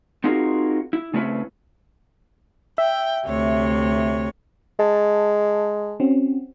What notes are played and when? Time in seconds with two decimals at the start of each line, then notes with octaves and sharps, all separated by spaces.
0.24 C4 D#4 F4 F#4 G#4 A#4
0.93 E4
1.14 C#3 A3 C4 C#4 E4 B4
2.78 E5 G5
3.28 D2 C3 C#5
4.80 G#3 A5
6.00 C4 C#4 F#4